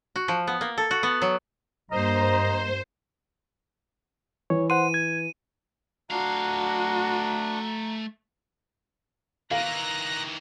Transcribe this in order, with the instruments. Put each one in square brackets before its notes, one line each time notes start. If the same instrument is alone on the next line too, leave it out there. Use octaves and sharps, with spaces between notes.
[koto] F#4
F3
B3
A#3
A4
F#4
B3
F#3
[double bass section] G2 A#3 [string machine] C5 [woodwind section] D#5 A#5
[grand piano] E3 [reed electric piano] C#5
[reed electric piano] C5 F#5 C6 [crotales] D#7
[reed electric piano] G#6
[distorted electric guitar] A3 F5 [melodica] D4 [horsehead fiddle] F#4 [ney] A#5
[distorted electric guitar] D#3 E3 [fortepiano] F5 [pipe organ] A#5 F#6 A#6